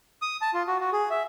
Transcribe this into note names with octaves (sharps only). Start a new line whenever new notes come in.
D#6
A5
F4
F#4
F#4
G#4
E5